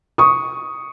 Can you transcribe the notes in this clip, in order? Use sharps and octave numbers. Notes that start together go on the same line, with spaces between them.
C#6 D#6